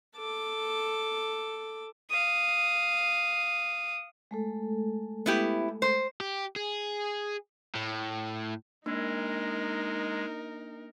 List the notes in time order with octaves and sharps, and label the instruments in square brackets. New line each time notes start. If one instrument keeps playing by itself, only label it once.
[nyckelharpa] A4 D6
[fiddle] F5 D#6
[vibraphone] G#3 A3 A4
[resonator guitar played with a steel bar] B3 E4 G4
C5
[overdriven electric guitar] G4
G#4
A2
[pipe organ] G#3 [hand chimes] A#3 D4 [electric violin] D#4 A#4